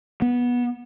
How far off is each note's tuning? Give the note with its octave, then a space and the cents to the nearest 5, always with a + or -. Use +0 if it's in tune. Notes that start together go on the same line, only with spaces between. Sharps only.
B3 -15